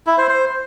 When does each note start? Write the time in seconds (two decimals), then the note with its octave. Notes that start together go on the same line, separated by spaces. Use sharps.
0.07 E4
0.18 C5
0.29 C5